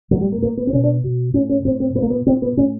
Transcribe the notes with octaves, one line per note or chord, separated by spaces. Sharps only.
A2 F#3
G3
A#3
A2 A#3
B3
C4
B2 C#4
D4
B2
A2 C#4
C#4
A2 C4
C4
A#2 B3
A#3
B3
A#2 C4
B3
A2 C#4